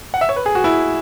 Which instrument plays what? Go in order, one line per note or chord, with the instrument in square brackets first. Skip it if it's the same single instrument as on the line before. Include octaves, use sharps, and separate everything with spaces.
[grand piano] F#5
E5
C#5
B4
G#4
F#4
E4